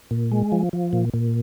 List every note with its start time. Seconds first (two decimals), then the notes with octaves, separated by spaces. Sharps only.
0.11 A#2
0.32 G#3
0.52 F3
0.73 F3
0.93 A#2
1.14 A#2